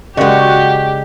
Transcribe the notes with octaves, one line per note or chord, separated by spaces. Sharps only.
C#3 G#3 F#4 G4 A#4 D5 D#5